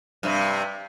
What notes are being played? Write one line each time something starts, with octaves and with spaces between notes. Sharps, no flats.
G2 C3